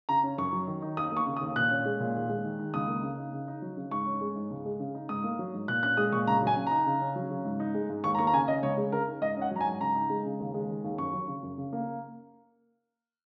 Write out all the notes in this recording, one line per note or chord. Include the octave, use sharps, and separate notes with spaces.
C#3 A#5
C#4
F#2 C#6
F#3
D#3
D#4
D#2 D#6
A#3 C#6
C#3
D#6
D#2
A#2 F#6
C#4
G#3
A#2
D#2
G#3
D#3
D#4
C#2 D#6
A#3
C#3
D#4
C#3
D#4
F#3
C#3
G#2 C#6
C#4
G#3
G#2
C#2
G#3
C#3
D#4
G#2 D#6
A#3
F#3
G#2
A#2 F#6
C#4 F#6
G#3 D#6
A#2 C#6
C#2 A#5
F#3 G#5
C#3
D#4 A#5
C#3
C#4
F#3
C#3
G#2
D#4
G#3
G#2
D#2 C#6
A#5
A#3 C#6
A#5
C#3 G#5
C#4 D#5
C#2 C#5
G#3
C#3 A#4
D#4
G#2 D#5
C#4 F#5
F#3 A#5
G#5
G#2
C#3 A#5
D#4
G#3
C#3
D#2
G#3
D#3
D#2
F#2 C#6
F#3
C#3
F#2
C#3
A#3